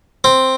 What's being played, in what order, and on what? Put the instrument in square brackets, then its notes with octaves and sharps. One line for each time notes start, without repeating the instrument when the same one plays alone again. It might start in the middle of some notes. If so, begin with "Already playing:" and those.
[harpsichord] C4